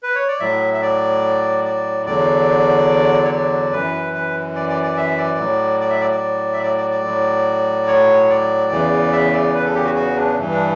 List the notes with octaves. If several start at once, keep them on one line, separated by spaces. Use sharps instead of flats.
B4
C#5
D5
A2 F#3 E5
E5
D5
D5
E2 D3 F#3 D5
C#5
D5
F#2 E3 B4
B4
D5
D5
D5
E5
D5
A2 F#3
D5
E5
D5
D5
E5
D5
D5
D5
A2 F#3
C#5
D5
E2 C#3 E3
E5
D5
B4
A4
G4
F#4
F#4
D4
G2 E3
D4